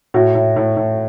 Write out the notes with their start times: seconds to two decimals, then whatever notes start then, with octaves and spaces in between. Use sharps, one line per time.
0.14 A2 F#4
0.35 A2
0.56 A2
0.77 A2